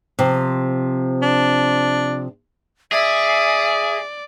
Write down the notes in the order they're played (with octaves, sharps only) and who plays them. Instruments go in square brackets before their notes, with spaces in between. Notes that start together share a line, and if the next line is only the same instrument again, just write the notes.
[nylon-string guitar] C3 F3
[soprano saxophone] D4
[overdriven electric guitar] G#4 [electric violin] D5 [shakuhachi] E5